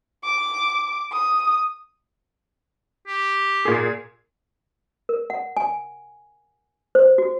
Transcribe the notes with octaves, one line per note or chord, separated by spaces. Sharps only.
D6
D#6
G4
A#2 G#4
A#4
F#5
G#5
C5
F#4